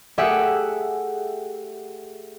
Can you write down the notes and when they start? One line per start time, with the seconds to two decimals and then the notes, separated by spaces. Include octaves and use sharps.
0.18 A3 G4 G#4 E5 F#5